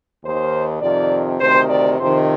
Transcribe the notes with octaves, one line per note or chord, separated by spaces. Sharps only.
D#2 D#3 C5
F2 C3 D#3 D5
D2 C3 D#3 C5
D5
F2 C3 D#3 C5